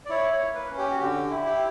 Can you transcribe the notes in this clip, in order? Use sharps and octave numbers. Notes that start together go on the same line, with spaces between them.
D5
E4 C#5
C#5
A#3
B4
C#4
G4
F#4
D3 G4
E4
G4